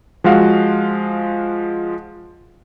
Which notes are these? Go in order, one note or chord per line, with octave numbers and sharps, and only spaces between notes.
F3 G#3 F#4 F5